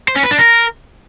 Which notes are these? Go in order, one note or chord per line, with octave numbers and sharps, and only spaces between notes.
C5
C#4
B4
D4
A#4